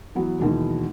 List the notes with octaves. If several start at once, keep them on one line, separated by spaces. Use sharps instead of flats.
E3 F#3 B3
D#2 B2 E3 F#3 G#3